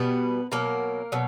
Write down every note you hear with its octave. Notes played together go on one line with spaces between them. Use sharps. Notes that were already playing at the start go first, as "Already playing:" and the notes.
Already playing: B2 G3 B3 B4
B2 F#3 A#3 A#4
B2 F#3